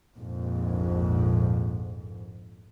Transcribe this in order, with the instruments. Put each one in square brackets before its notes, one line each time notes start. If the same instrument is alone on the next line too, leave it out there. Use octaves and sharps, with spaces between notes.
[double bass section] A#1 F2 G#2